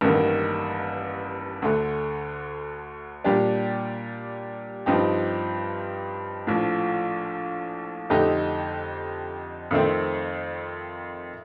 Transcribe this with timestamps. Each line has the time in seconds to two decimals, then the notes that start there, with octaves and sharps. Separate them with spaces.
0.01 A1 G2 D#3 A#3
1.62 D2 D3 A3
3.24 A#2 G3 D4 G4
4.86 G2 F3 C4 D#4 G4
6.47 A#1 A2 F3
8.10 F2 D3 A3 D#4 G4
9.71 F2 D#3 A3 C4